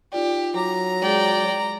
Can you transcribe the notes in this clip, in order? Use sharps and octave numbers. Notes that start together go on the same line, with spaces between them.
D#4 F4 G4 D5
F#3 A#5 D6
G#3 G#4 D5 G5